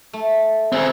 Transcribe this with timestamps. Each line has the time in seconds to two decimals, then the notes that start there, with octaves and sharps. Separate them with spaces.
0.13 A3
0.72 C4 G#4